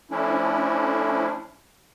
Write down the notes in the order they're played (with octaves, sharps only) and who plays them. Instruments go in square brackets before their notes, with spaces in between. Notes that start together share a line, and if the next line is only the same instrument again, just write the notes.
[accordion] F3 A3 C#4 D4 E4